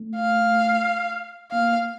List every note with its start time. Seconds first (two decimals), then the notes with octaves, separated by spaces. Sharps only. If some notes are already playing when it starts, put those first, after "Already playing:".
Already playing: A3
0.16 F5
1.51 A#3 F5